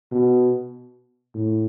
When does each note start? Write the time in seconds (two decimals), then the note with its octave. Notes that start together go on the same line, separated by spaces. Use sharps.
0.12 B2
1.35 A2